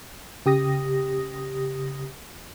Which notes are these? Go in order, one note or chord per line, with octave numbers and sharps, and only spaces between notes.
C#3 G4 D#6 A#6